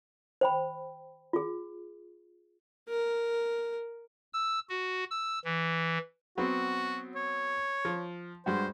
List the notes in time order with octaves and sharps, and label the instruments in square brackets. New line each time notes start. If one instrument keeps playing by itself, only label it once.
[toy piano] C5 G5 B5
F4 G#4
[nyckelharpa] A#4
[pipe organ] E6
F#4
E6
E3
[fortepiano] F#3 B3 C4 [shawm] F#4
[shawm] C#5
[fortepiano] F3
[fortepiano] G2 G#3 F#4 [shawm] C5